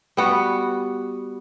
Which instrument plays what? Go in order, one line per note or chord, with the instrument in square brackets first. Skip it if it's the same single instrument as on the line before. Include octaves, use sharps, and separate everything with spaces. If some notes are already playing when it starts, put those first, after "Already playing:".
[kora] G3 B3 F#4